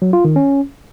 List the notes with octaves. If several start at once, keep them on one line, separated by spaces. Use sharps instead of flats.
F#3
F4
D#3
C#4